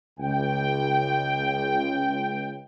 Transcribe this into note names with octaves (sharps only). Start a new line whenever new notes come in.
C#2 G5